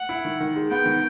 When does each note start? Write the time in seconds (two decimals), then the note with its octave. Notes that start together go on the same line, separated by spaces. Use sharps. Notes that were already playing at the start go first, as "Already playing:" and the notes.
Already playing: F#5
0.09 E4
0.25 D#3
0.40 D#3
0.56 G#3
0.71 B3 G5
0.86 D#3